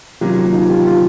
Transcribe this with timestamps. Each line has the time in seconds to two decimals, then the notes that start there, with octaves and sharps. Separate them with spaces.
0.21 C3 D#3 F#3 A#3 C#4 F4 G4
0.53 D#4 F4
0.69 F4 G4
0.85 F4 G4